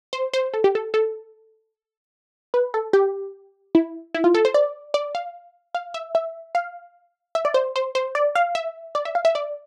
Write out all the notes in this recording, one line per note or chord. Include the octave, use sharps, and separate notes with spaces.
C5
C5
A4
G4
A4
A4
B4
A4
G4
E4
E4
F4
A4
C5
D5
D5
F5
F5
E5
E5
F5
E5
D5
C5
C5
C5
D5
F5
E5
D5
E5
F5
E5
D5